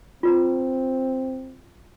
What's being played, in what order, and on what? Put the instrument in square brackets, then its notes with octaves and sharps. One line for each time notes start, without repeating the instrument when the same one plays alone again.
[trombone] C4 [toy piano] F4 B4 A#5